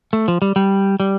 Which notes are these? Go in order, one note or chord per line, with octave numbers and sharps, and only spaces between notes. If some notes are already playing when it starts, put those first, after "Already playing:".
A3
F3
G3
G3
G3